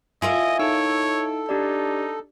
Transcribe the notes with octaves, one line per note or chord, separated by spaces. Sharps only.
E4 F4 A#4 D#5 G#5
D#4 A4 C#5 E6 D7
D4 D#4 G4 D5